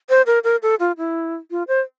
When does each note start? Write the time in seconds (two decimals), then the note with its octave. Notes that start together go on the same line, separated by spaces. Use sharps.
0.10 C5
0.26 A#4
0.44 A#4
0.62 A4
0.80 F4
0.98 E4
1.51 F4
1.68 C5